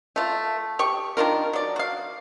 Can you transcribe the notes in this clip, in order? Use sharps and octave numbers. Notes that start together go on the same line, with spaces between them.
A3 F4
G4 C#6
D#3 D4 F4 A#4
F#3 D5
F#4 F5